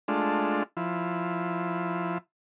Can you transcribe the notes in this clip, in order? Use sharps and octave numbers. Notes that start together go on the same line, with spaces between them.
G#3 A3 D4 F4
F3 E4